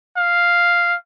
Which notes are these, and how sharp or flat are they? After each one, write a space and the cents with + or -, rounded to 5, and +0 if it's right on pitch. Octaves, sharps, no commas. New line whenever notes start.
F5 +0